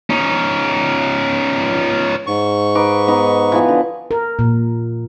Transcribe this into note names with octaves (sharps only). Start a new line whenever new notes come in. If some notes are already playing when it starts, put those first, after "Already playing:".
C#4 D#4
G#2 C#6
D#4 B4 D6
B3 D#4 B4
E3 F3 B3
D3
A#4
A#2